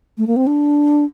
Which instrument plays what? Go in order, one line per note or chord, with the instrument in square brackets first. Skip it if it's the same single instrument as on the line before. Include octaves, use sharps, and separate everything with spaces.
[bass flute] A3
A#3
C4
D4